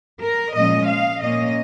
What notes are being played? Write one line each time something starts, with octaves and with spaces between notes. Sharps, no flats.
A#4
A#2 F3 G#3 C#4 D#5
F5
A#2 A#3 C#4 D#5